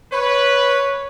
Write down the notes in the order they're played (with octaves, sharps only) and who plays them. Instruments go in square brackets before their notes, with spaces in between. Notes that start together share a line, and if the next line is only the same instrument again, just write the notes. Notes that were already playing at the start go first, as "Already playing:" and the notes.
[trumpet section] B4 [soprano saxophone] C#5